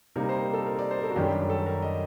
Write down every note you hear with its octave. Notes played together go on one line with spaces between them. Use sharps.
C3 G3 A#3 D#4 A#4
C5
A#4
A4
A#4
D5
C5
A#4
A4
F#4
F#2 D#3 G3 D4 G4
G4
A4
A#4
D#5